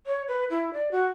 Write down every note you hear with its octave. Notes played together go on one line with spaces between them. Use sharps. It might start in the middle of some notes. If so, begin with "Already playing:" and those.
C#5
B4
E4
D5
F#4